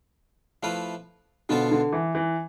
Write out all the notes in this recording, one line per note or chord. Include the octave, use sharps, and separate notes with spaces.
F3 A3 E4 B4 F5
B2 D3 B3 F4 A4 C5
D3
E3
E3